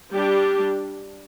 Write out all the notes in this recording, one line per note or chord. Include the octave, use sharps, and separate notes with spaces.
G3 D4 G4